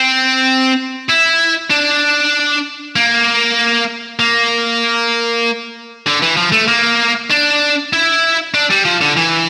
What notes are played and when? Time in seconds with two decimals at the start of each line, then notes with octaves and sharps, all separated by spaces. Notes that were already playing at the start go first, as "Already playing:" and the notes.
Already playing: C4
1.09 E4
1.70 D4
2.96 A#3
4.20 A#3
6.06 D3
6.22 E3
6.37 F3
6.52 A3
6.68 A#3
7.30 D4
7.93 E4
8.54 D4
8.71 G3
8.85 F3
9.02 D3
9.17 E3